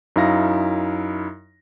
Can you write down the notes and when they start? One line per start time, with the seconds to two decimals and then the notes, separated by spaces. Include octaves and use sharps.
0.16 F#2 D#4 E4 F5 A#6